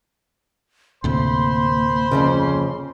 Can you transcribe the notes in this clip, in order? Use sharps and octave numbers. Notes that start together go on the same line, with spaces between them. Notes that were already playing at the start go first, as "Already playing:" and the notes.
D2 A2 C3 A#3 C5 B5 C6
F2 G#2 C#3